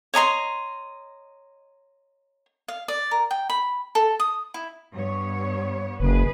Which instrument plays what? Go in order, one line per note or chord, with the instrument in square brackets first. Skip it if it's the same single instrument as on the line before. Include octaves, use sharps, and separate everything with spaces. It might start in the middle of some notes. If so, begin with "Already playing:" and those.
[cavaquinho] C#5 D#5 A#5 C6
F5
D5
A#4
G5
B5
A4
D#6
E4
[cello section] G2 B3 C#5
[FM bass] F#1 [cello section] G#4 B4